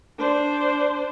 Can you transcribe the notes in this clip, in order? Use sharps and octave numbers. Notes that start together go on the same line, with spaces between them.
D4 C5